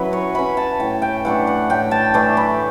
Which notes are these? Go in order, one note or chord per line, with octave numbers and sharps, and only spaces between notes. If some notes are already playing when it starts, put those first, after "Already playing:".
Already playing: F#3 C#4 E4 F#4 B4
C#5
C#4 E4 B5
A5
A2 G5
G5
E3 A3 D4 F#5
F#5
A2 G5
A5
E3 A3 D4 A5
B5